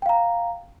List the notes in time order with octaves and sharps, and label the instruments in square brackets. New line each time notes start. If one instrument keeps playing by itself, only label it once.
[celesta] G5
F5
A#5